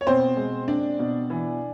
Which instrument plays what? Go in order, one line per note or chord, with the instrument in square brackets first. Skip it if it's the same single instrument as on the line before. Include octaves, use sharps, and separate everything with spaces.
[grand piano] C#5
B2 C4 C5
G#3
C4 D4 D5
B2
E3